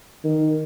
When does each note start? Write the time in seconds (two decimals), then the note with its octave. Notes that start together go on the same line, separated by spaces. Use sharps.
0.24 D#3